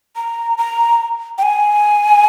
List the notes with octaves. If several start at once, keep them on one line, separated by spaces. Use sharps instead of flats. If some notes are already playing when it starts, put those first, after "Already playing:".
A#5
A#5
G5
G#5